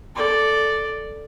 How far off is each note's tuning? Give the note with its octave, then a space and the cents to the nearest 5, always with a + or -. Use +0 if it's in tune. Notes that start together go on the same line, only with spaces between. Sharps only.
A4 +0 D5 +0